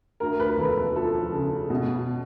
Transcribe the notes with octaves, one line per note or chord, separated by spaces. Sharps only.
D2 A#4
B4
E1 A4
F3 A4
C#3
B2